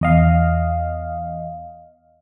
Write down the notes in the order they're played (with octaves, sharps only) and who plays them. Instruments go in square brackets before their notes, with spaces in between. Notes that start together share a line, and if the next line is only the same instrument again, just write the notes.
[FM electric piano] E2 D#5 F5